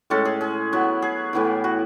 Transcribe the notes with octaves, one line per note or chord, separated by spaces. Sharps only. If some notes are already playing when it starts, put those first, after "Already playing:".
A2 G#3 C#4 A4
G#4
G#4
F#3 B3 E4
G#4
A2 E3 B3 E4
F#4